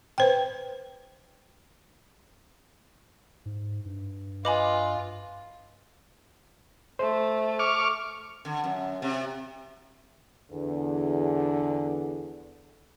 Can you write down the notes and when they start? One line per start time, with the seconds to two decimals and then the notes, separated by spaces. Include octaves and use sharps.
0.18 B4 C5 G5
3.46 G#2
3.85 G2
4.45 F4 B4 D#5 G#5 B5 D6
6.99 A3 C5
7.59 C#6 D6 F6
8.45 D3
8.64 F#2
9.02 C3
10.51 E2 D3